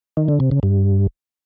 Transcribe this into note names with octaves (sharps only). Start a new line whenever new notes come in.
D#3
D3
C3
C#3
G2